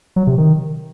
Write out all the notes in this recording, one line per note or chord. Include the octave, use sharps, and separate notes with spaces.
F#3
C3
D#3